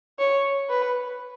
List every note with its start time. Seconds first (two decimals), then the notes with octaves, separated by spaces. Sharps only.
0.19 C#5
0.69 B4